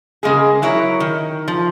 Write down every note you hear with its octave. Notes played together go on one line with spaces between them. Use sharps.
C#3 G#3 A#3 G#4
F#3 E4 A#4 C#5
D#3
F3